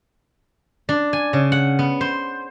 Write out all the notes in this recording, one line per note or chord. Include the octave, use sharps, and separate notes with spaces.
D4
G#5
C#3
F#5
B3
C5